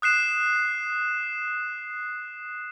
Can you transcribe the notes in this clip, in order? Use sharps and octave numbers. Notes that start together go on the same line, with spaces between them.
D#6 F#6 C7 E7